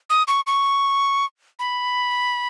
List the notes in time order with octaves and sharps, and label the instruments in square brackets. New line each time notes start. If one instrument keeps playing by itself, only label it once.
[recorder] D#6
C#6
C#6
B5